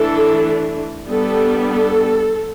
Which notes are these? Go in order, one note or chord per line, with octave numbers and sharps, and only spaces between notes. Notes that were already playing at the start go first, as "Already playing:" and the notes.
Already playing: E3 A3 D4 A4
G3 B3 D4 A4
A4